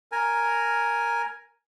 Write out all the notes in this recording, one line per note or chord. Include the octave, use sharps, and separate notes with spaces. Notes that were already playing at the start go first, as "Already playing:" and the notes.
A#4 G#5